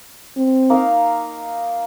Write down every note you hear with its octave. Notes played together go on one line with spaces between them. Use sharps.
C4
A#3 D#4 A#4 F5